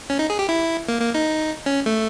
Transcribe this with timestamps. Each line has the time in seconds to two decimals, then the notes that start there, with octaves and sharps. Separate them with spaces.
0.10 C#4
0.19 D#4
0.30 G#4
0.39 G4
0.49 E4
0.88 A#3
1.01 A#3
1.15 D#4
1.66 C#4
1.86 A3